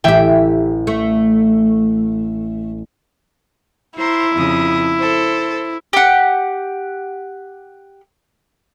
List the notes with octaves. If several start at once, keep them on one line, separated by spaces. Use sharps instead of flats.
A1 E4 G4 E5 G5
A3
E4 C5 A#5 C6
F2 C#3 D#6
A4 C5
G4 F#5